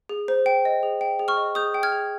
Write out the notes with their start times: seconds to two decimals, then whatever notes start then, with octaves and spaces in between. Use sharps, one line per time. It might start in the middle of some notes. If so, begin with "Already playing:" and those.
0.09 G#4
0.28 C5
0.46 G5
0.65 D#5
0.83 G#4
1.01 G5
1.19 G#4
1.28 C#6 F6
1.37 D#5
1.55 G#4 D#6 G6
1.74 G5
1.83 F6 G#6
1.92 G#4